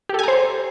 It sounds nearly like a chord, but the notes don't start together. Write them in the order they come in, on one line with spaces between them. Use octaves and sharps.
G4 A4 G#5 A#5 C5